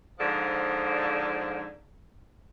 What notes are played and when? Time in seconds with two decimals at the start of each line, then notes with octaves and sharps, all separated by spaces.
0.19 G#2 D3 F3